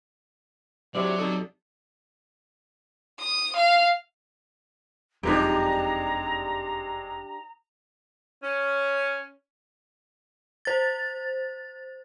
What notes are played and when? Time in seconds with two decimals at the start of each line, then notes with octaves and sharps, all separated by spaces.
0.95 C3 F#3 G#3 D4 E4 D5
1.18 F#2 C3 D#4 A4
3.20 D#6
3.56 F5
5.23 F#1 F2 C3 G#3 D4 D#4 G4 A#5
8.43 C#4
10.65 C5 A6